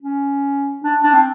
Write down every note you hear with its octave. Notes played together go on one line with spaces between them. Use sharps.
C#4
D4
D4
C4